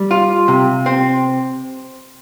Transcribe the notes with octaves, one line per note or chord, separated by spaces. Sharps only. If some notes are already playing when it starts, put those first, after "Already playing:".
Already playing: G3
F4
C3
C4